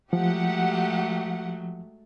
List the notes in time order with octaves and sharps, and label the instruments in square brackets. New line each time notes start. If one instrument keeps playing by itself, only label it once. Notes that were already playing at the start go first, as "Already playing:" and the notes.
[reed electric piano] F3 [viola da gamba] F#3 G#3 A3 [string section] G4 F#5